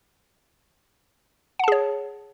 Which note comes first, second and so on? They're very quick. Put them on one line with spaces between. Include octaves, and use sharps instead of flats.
F#5 A5 G#4 C#5